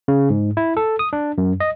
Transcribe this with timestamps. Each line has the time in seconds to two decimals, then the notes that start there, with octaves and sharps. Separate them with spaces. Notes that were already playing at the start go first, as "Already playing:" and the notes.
0.08 C#3
0.30 G#2
0.57 E4
0.77 A4
0.99 D#6
1.13 D4
1.38 F#2
1.60 D#5